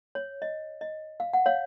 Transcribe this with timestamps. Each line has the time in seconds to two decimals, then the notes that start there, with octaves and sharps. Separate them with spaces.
0.15 C#5
0.42 D#5
0.81 D#5
1.20 F5
1.33 F#5
1.46 C#5 F5